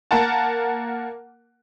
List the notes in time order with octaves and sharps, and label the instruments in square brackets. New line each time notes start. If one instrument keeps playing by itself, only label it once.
[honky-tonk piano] A#3 A#4 F#5 A5